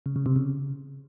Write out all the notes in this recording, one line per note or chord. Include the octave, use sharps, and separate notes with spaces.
C#3
C#3
C3
C#3